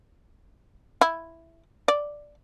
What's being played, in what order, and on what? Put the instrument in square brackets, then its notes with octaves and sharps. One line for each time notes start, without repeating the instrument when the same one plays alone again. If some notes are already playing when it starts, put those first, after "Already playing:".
[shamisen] E4
D5